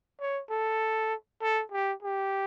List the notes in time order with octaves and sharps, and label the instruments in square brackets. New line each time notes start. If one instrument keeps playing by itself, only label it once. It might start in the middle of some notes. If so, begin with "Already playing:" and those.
[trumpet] C#5
A4
A4
G4
G4